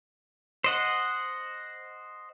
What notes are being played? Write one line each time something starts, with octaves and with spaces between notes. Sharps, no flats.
C5 D#5 F#5